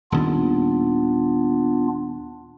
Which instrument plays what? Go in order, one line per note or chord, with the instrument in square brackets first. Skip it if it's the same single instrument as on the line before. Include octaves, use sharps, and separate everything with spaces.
[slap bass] D#1 D#2 [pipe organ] B3 D4 F4